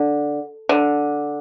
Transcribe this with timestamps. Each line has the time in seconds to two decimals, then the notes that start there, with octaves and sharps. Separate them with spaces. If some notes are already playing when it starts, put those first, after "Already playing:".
Already playing: D3
0.69 D3